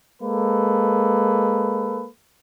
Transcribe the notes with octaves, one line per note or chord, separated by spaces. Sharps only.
G#3 A#3 A4 B4